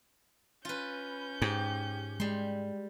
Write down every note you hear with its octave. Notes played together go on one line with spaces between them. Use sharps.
C#4 F4 B4 G6
G#2 G4
G3 G#3 C6